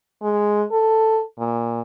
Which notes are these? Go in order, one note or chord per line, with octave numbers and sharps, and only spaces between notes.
G#3
A4
A#2